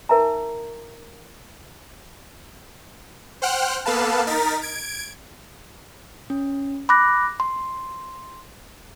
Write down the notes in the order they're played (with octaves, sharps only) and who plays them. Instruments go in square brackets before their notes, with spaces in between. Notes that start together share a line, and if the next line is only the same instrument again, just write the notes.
[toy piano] D#4 A#4 E5 G#5 A#5
[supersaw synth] C5 F#5 G5 F6 F#6
A#3 B3 A4 B4 F5 A5
D#4 A#4 A6 B6
G#6 D7
[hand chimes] C#4
B5 D6 F#6 A#6
C6